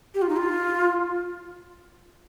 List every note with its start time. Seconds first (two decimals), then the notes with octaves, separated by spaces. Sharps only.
0.15 G4
0.22 F4
0.29 D#4
0.37 F4